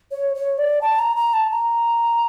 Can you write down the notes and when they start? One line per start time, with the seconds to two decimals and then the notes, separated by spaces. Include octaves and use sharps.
0.12 C#5
0.35 C#5
0.58 D5
0.81 A5
0.99 A#5
1.16 A#5
1.34 A5
1.51 A#5